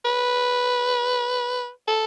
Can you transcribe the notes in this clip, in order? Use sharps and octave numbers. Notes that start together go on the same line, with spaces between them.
B4
A4